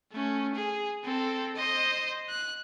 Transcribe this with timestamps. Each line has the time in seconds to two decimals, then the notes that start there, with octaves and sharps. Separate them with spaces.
0.12 A3 C#4
0.55 G#4
1.04 C4 A4
1.56 C5 D#5
2.29 F#6